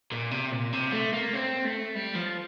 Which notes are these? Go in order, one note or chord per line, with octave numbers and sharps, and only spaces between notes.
A#2
C3
A#2
C3
A3
A#3
C4
A3
G3
F3